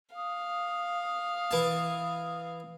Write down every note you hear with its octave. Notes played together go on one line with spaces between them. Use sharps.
F5 D#6
E3 A5